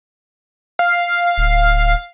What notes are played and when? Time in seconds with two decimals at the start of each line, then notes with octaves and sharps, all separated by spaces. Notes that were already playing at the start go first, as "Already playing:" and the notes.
0.79 F5
1.38 D1